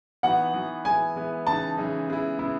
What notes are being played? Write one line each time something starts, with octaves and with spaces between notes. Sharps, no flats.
E3 B3 D#4 F#4 F#5
E3 B3 D#4 F#4
E3 G#3 B3 E4 G#5
E3 G#3 B3 E4
C#3 E3 G#3 D#4 A5
C#3 E3 G#3 D#4
C#3 G#3 B3 E4
C#3 G#3 B3 E4